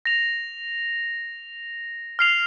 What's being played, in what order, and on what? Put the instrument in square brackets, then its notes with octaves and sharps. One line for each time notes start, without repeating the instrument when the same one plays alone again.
[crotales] A#6 F7
F6 C7 F7